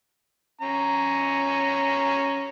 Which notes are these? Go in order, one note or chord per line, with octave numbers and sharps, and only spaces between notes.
C#4 A#5